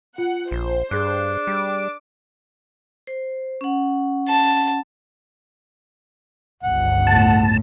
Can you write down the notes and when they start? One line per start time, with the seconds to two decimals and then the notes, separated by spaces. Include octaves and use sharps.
0.18 F4 F#5
0.51 A#1 C5
0.91 G2 D4 G#4 F#6
1.47 G3 D6
3.07 C5
3.61 C#4 F#5
4.29 A5
6.63 G1 C#2 F#5
7.07 B1 A2 A5